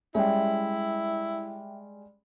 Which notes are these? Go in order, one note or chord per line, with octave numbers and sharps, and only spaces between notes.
G3 G#3 C#4 E4 E5 G5